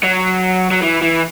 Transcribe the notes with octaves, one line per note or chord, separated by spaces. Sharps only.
F#3
F#3
E3
E3